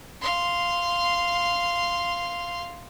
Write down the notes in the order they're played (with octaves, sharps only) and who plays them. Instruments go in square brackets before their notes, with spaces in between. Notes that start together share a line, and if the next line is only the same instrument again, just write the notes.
[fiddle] F5 C6